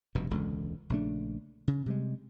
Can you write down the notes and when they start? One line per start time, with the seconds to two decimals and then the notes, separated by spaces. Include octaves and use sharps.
0.15 F1 G2 B2
0.30 E1 C#2 D3
0.90 A#1 C#3 A3 D4
1.68 C#3
1.86 C3 G3 G#3